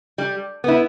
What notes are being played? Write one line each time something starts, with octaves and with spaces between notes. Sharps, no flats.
G3
B3 E4